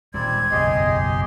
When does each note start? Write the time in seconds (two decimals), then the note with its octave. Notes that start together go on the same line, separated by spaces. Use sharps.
0.14 D#1 D#2 G3 G#3 C4 D5 G#6
0.52 F#1 B1 E2 G4 G#4 D#5 C6